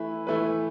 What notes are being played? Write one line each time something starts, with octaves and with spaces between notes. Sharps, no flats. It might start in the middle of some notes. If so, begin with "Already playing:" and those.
Already playing: E3 A3 E4 B4
E3 A3 E4 B4